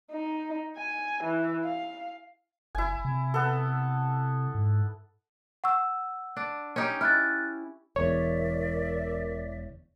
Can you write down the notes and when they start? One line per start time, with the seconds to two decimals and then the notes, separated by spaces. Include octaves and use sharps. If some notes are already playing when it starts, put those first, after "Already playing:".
0.11 D#4
0.77 G#5
1.24 E3
1.64 F5
2.75 F#1 E4 G#5
3.05 C3
3.34 B3 A4
4.55 G#2
5.64 F#5 C#6 E6
6.37 D4
6.76 C#4 D#4 G4
7.01 E4 F6 F#6 A6
7.96 E1 E2 A#4 C#5 D5 E5